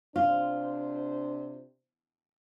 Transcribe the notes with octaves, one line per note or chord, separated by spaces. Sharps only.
C3 D4 F4 C5